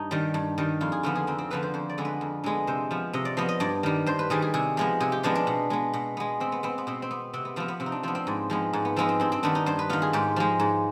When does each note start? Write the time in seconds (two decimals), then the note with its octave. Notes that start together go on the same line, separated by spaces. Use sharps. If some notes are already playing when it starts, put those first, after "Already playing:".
Already playing: G2 D#4
0.11 D#3 G3
0.34 G2
0.58 D#3 G3
0.81 F2 F4
0.92 G#4
1.03 D3 F3 B3 F4
1.15 G#4
1.27 F2 C4
1.38 C4
1.50 D3 F3 B3 B4
1.63 C5
1.74 F2 C5
1.89 D5
1.98 D3 G#3 B3
2.05 B4
2.21 F2
2.44 D3 G#3 B3
2.67 C3 C5
2.91 F3 B3
3.13 C3 D#5
3.25 D5
3.37 F3 B3 D#5
3.49 D#5
3.60 G2 D5
3.83 D#3 G3
4.06 G2 C5
4.19 B4
4.30 D#3 G3 G#4
4.42 G#4
4.54 C3 G#4
4.77 F3 G#3 B3
5.00 C3 G#4
5.12 G4
5.23 F3 G#3 B3 D4
5.35 D4
5.47 B2
5.70 G#3 B3
5.93 B2
6.17 G#3 B3
6.40 B2 C4
6.52 B3
6.63 B3 C4
6.78 B3
6.87 B2 C4
7.02 C4
7.11 B3
7.33 C3 C4
7.45 B3
7.56 F3 B3 C4
7.68 B3
7.80 C3 C4
7.86 D#4
7.92 D4
8.03 F3 B3 C4
8.15 C4
8.27 G#2
8.50 F3 G#3 B3
8.73 G#2
8.85 B3
8.96 F3 G#3 B3 C4
9.09 C4
9.20 G2 C4
9.32 C4
9.43 D#3 B3 D4
9.55 D#4
9.66 G2 C5
9.79 B4
9.89 D#3 B3 F4
10.02 G#4
10.13 G#2 G4
10.36 F3 G#3
10.60 G#2